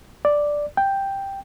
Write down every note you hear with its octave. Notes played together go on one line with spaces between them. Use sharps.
D5
G5